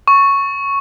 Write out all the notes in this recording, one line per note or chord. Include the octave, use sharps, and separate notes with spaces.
C#6